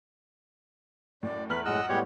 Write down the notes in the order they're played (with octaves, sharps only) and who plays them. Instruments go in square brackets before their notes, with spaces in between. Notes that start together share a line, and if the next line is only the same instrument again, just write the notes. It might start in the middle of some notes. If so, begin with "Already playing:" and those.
[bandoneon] F#2 [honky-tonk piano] A2 [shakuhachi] D5
[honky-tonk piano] E2 F6 F#7 [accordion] A3 [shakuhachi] B4
[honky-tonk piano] A#1 F#2 [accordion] A2 G#3 F#6 [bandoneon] D#5 E6 [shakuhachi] F#5
[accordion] A2 G3 B3 [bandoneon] G#3 G4 C#5